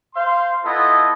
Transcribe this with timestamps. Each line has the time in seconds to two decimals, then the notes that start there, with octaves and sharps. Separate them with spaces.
0.15 C5 F5 C6
0.64 B3 E4 F4 A4 D#5